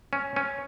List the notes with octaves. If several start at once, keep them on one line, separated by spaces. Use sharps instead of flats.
C#4
C#4